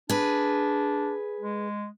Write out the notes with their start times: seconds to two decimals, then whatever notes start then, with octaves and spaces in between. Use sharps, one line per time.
0.10 D4 G#4 B4
1.40 G#3